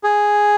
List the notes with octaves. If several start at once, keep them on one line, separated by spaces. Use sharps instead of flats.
G#4